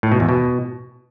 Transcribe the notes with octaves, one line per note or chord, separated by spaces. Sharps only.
A2
B2
E2
B2